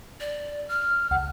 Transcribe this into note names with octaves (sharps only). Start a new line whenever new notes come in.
D5
F6
C#2 F#5